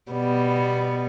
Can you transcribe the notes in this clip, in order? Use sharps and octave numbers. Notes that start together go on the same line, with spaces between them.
B2 G3 B3